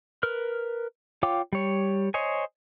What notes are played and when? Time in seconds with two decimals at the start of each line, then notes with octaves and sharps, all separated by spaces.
0.23 A#4 B4 F6
1.23 F4 C#5 F5 G5 D6
1.53 G3 C#5
2.14 C5 C#5 D#5 G#5